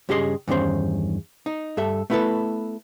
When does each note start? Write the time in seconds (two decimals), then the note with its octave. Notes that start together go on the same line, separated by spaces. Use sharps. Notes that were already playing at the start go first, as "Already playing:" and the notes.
0.09 G2 C#3 G4 G#4 D#5 C6
0.48 E2 G2 D#3 C#4 C5
1.46 D#4
1.77 G2 A4 E5
2.10 A3 B3 E4 G#4 A4 B4